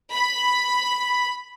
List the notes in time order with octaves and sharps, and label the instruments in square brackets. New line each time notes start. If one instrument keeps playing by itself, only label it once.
[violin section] B5